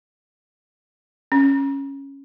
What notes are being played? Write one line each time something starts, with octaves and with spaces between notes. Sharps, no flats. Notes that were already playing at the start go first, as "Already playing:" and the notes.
C#4